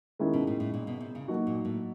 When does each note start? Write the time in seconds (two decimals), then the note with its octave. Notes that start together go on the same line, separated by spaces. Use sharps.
0.19 D#3 G#3 C#4 E4
0.34 B2
0.47 A2
0.60 A2
0.74 A#2
0.87 B2
1.00 C3
1.15 C#3
1.28 F#3 A#3 D#4 F#4
1.47 A#2
1.65 A2